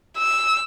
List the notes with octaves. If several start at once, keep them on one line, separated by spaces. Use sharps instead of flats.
E6